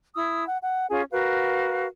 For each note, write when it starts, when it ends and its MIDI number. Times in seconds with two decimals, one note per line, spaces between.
0.15 0.44 64
0.15 0.44 87
0.15 0.44 88
0.47 0.58 78
0.63 0.85 78
0.89 1.03 61
0.89 1.03 65
0.89 1.03 68
0.89 1.03 80
1.11 1.86 66
1.11 1.86 70
1.11 1.86 71
1.11 1.86 77